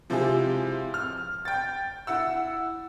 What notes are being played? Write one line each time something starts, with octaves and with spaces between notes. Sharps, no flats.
C3 F3 G#3 E4 G4 G#4
F6
G5 A6
E4 F#5 E6